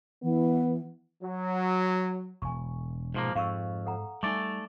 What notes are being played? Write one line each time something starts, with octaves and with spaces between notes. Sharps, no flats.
E3 B3
F#3
E1 G#5 C#6
G#2 B2 F3 A#3
F2 G#2 F5 C#6 E6
A4 F#5 A#5
G3 A3 D#4 D5 D6